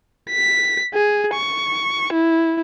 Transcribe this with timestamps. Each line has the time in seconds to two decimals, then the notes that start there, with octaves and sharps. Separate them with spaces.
0.30 B6
0.94 G#4
1.34 C#6
2.13 E4